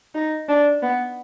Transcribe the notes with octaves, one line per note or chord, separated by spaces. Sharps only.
D#4
D4
B3